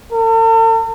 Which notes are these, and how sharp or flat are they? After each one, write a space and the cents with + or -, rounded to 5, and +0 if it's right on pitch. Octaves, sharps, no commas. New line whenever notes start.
A4 +45